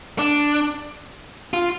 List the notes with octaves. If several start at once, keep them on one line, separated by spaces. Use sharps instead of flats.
D4
F4